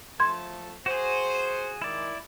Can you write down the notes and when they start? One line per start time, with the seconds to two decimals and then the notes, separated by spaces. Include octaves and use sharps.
0.20 F3 A3 A5 C6 G#6
0.86 F#4 G#4 C5
1.82 D#3 G#3 E4 D5